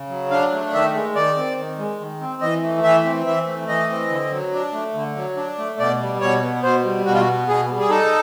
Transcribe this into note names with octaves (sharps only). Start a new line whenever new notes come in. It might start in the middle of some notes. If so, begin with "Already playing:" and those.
Already playing: C#3
F#3
D4 F5
A3
D#3 E5
G#3
D#3 D5
C4
D#3
G#3
D#3
C4
E3 D#5
A3
E3 E5
C4
E3 E5
A3
E3 D#5
C4
D3
F#3
D4
A3
D3
F#3
D4
A3
B2 D5
G3
B2 C#5
B3
B2 C5
G3
B2 F#4
F4
F#4
B3
B2 G#4
G3
G#4
D#4 A4